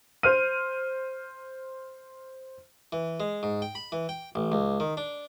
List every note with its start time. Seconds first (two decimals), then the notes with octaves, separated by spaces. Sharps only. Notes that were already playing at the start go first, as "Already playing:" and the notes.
0.23 C5 F6 D#7
2.93 E3
3.20 G#3
3.43 G#2
3.62 G5
3.75 B5
3.92 E3
4.09 G5
4.35 A1
4.52 C#2
4.80 D#3
4.97 D4